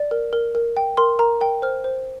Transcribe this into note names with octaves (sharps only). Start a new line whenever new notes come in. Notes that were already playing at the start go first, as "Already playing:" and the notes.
Already playing: D5
A#4
A#4
A#4
G5
A#4 C6
A#4 A#5
A#4 G5
C5 F6
C5